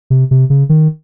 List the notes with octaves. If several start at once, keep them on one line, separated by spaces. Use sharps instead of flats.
C3
C3
C#3
D#3